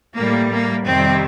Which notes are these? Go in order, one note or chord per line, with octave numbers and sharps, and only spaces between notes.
A2 G3 A#3
A#3
F2 C3 D#3 G3 C4